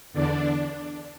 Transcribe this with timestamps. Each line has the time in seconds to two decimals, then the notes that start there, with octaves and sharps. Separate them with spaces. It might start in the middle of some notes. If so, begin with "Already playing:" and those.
0.13 E2 D3 D4